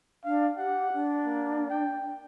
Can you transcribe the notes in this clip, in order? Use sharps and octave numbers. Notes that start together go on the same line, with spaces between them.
D4 F5
G4 F#5
D4
A#3
G5